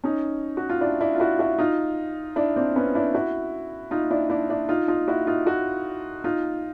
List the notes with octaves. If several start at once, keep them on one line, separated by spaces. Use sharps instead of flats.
C#4 D#4
F#4
F4
D4 E4
D4 E4
F4
E4 F#4
E4 F#4
D#4 F4
D4 E4
C4 D4
B3 C#4
D4 E4
E4 F#4
D#4 F4
D4 E4
D4 E4
D4 E4
D#4 F4
D#4 F4
E4 F#4
D#4 F4
E4 F#4
D#4 F4